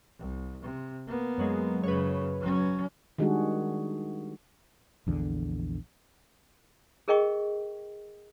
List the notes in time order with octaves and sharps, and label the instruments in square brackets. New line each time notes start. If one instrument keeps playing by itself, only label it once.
[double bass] C2
C3
A#3 B3
[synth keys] F#2 F#3 G#3
[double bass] F#2 C#3 [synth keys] B4 C#5
[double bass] F#3 C#4
[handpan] D#3 G3 G#3 D4 F#4 G#4
[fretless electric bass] A#1 E2 D3
[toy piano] G#4 A#4 D#5 G5 C#6